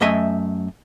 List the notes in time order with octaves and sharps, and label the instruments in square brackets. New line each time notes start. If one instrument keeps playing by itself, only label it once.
[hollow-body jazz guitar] F#2 A3 D#5 E5 G#5